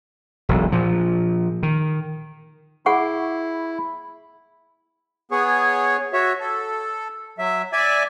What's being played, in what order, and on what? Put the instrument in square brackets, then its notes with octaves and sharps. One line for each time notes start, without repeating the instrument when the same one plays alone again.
[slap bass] E1 B1
A#2 F3
D#3
[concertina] E4 [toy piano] G#4 F#5 C#6
[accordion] B3 G#4 C#5
F#4 C#5 E5
A4
F#3 E5
D5 E5 G#5